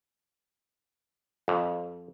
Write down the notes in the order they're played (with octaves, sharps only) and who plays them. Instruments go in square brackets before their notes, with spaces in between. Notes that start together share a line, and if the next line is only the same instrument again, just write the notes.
[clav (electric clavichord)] F2